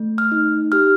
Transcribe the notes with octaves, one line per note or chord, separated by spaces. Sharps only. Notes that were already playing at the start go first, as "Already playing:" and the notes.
Already playing: A3
F6
D#4
G4 F6